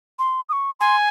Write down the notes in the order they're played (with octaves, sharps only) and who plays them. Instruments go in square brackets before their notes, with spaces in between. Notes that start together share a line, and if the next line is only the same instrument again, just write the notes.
[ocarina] C6
D#6
C#6
[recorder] G#5 [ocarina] C6